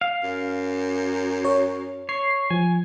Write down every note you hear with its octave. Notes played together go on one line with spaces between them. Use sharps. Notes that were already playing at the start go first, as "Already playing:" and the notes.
F5
F#2
C#5
C#5 C7
F3 G#5